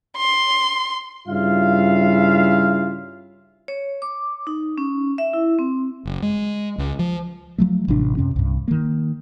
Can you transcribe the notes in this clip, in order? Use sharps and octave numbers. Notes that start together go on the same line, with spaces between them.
C6
G2 C#3 E4 F4 E5 F5
C#5
D6
D#4
C#4
E5
E4
C4
F#1
G#3
C#2
F3
F3 F#3 A3
A1 C3 E3 D4
F#2 C3 C#4
C2 G2
D#3 A#3